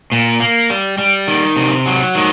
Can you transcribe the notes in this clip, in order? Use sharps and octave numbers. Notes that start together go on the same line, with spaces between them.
A#2
A#3
G3
G3
D#3
C3
F#3
D#3